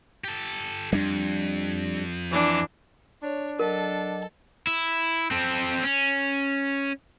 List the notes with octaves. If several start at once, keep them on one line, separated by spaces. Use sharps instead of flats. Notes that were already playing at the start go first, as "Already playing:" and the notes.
G4 A4
F2 G3 D4
E3 D4
D4 C#5
F#3 A4 A#4 D#5
E4
C4 A4
C#4